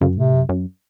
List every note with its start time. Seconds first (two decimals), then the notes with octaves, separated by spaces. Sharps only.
0.01 F#2 C#3
0.17 A2 C3
0.33 F#2
0.49 F#2